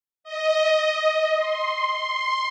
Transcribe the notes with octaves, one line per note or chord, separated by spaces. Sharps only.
D#5
C6